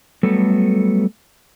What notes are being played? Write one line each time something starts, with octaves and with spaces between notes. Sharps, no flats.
F#3 G3 A3 B3 A4